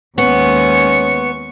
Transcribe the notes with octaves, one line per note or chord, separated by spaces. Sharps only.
D#2 G#3 B3 C#4 C#6